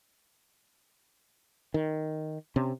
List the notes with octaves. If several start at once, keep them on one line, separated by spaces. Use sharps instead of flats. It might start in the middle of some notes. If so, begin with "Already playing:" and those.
D#3
C3 C#4